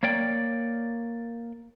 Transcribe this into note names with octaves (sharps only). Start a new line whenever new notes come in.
A#3 C#5 D5 G5